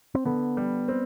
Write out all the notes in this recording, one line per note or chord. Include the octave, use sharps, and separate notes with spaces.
C4
D3 B3
G3
C4